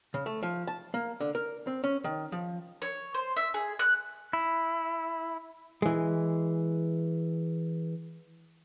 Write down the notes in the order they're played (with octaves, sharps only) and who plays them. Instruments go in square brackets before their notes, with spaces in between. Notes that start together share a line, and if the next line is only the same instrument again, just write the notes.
[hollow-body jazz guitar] C#3
A3
F3
A5
A#3
D3
A#4
C4
C#4
D#3
F3
[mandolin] C#5
C5
E5
G#4
F#6
[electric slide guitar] E4
[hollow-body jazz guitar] E3 G#3